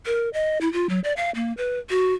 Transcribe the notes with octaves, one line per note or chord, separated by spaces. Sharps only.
A#4
D#5
E4
F4
F#3
D5
F5
A#3
B4
F#4